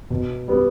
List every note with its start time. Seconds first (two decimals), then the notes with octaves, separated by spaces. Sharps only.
0.10 B2
0.48 G3 B3